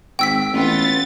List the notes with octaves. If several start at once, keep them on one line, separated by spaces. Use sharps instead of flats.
G#1 G5 E6 B6
A1 B3 F4 A6